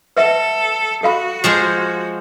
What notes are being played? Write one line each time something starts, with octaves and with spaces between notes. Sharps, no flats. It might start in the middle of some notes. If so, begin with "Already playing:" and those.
A4 B4 E5 F#5
F#4 A4 F5 B5
F3 G#3 C5